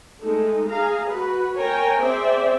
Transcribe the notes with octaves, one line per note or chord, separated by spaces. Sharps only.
G#3 A3 D#4 A4
G#4 F5 A#5
F#4 B4
A#4 C#5 G5 G#5 A#5
C4 G#4 C5 D5 E5 G5